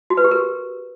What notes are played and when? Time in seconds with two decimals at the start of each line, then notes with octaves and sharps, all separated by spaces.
0.10 F#4
0.17 B4
0.24 G4
0.31 A#4